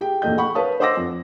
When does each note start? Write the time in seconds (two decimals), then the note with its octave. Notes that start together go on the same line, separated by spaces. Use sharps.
0.01 G4 G#4 G5
0.22 A#1 E2 A3 D#5 G6
0.38 F#5 B5 C#6
0.55 B4 C#5 F5 A5 D#6
0.80 C5 D#5 F#5 D6 E6 A#6
0.97 F2